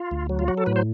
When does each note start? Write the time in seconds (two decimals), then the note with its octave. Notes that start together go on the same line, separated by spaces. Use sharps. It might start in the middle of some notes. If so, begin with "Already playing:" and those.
Already playing: F4
0.11 D2
0.29 F#3
0.39 F4
0.48 F#3 F#4
0.57 A4
0.66 A2 B4
0.76 C5